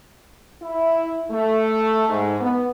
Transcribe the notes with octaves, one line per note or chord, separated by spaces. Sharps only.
E4
A3
G#2
B3